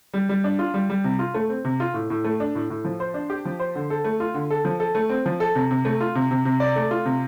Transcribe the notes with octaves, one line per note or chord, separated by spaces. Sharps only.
G3
G3
D4
F4
G3
G3
C3
F4
A3
C4
C3
F4
A2
A2
A3
D4
A2
A2
F3
C5
D4
G4
F3
C5
D3
A4
A3
F4
D3
A4
F3
A4
A3
C4
F3
A4
C3
C3
A3
F4
C3
C3
C3
D5
A3
F4
C3